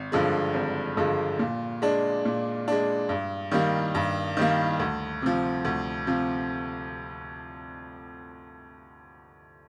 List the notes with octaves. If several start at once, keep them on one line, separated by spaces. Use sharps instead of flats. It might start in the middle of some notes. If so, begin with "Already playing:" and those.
Already playing: G#1
G2 D3 F3 G#3
G#1
G2 D3 F3 G#3
A#2
G#3 D4
A#2
G#3 D4
G2
D#3 G3 A#3
G2
D#3 G3 A#3
D2
C3 F3
D2
C3 F3